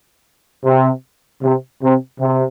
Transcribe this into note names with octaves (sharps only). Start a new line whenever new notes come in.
C3
C3
C3
C3